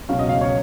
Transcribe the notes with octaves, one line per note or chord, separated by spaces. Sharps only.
C#2 B2 F#3 C#4 F5
D#5
F5
C#5